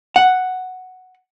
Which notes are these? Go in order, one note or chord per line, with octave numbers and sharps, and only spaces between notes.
F#5